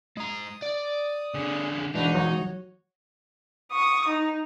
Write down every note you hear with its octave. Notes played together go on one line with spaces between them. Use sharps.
G#3 A#5 D#6
D5
D3 G#4
E3 G#3 D4 D#4 F#4 B4
F#3 F#4 C#5
C#6 D#6
D#4